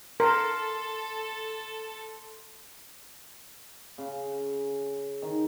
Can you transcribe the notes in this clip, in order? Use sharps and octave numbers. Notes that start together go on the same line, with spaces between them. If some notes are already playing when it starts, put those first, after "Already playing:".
A4 A#4 C6
C#3
D#3